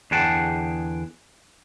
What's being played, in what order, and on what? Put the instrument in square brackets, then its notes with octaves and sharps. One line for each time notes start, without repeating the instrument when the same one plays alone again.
[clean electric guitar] E2 D3 G#4 F#5 G5 A5